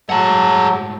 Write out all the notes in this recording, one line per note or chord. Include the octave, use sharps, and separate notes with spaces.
G#2 F#3 A3 G#4 A4 F#5